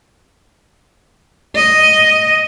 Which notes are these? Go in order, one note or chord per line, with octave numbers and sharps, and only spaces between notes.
D#5